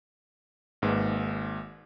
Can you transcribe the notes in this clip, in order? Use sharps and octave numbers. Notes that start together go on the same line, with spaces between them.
G#1 G#2 A#3 B4